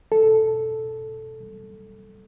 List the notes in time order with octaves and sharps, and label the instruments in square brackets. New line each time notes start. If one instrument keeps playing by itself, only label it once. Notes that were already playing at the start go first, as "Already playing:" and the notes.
[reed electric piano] A4